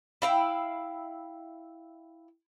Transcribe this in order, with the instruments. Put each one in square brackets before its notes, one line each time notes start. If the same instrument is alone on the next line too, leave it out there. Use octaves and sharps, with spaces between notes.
[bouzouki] E4 F5 G5